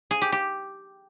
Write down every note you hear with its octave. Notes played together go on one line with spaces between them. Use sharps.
G#4
G4
G4